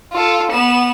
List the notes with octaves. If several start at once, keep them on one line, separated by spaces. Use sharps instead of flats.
F4 A4
B3 E7